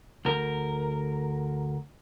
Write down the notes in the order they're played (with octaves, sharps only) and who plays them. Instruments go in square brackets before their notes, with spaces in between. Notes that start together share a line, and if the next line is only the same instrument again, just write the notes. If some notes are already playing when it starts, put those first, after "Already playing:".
[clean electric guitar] D2 A#4